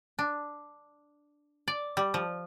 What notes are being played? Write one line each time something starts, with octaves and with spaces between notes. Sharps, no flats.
D4
D5
G3
F3